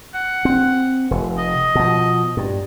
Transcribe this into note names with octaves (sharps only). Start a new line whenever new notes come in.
F#5
C4
F1
D#5
B2 F3
G2